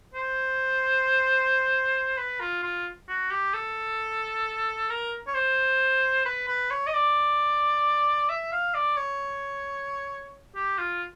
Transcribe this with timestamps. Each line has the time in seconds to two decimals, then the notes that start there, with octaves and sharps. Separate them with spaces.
0.14 C5
2.18 B4
2.40 F4
2.63 F4
3.09 F#4
3.31 G4
3.54 A4
4.90 A#4
5.27 C#5
5.35 C5
6.26 B4
6.48 B4
6.71 C#5
6.87 D#5
6.94 D5
8.29 E5
8.52 F5
8.75 D5
8.97 C#5
10.56 G4
10.78 F4